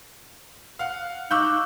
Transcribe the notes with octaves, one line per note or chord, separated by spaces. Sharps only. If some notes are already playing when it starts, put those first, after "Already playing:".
F5 F#5
D#4 F5 C#6 D6 E6 F#6 G6